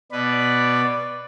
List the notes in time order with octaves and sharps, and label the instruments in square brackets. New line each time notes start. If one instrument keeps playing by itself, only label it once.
[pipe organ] B2 B4 [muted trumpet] D5